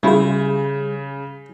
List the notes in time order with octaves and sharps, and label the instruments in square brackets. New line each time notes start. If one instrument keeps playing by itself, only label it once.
[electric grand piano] C#3 [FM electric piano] G3 G#4 [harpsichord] A3 E4 F4